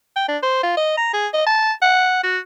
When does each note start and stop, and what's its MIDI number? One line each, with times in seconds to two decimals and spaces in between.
0.16 0.27 79
0.28 0.37 62
0.42 0.61 72
0.63 0.76 65
0.77 0.94 75
0.97 1.08 82
1.13 1.27 68
1.33 1.45 75
1.46 1.72 81
1.82 2.19 78
2.23 2.38 66